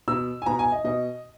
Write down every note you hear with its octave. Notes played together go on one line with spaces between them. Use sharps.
B2 E6
G#5
B2 A#5
G#5
D#5
B2 D#5